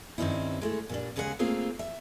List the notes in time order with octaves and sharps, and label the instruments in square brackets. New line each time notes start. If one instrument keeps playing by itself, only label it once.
[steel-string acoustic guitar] G2 D#3 C4 C#4 D#4 E4
G#3 A3 E4
A#2 G3 D4
D#2 C#3 G#3 G#4 A#4 F#5
A3 A#3 C4 F4 G#4 A#4
E5